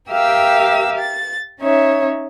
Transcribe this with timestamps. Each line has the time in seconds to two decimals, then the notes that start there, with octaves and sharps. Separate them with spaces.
0.10 G4 A#4 E5 F5 G5 E6
0.99 A6
1.59 C#4 D#4 C#5 E5